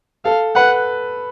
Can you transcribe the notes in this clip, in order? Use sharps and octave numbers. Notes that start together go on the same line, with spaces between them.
A4 F5
B4 F#5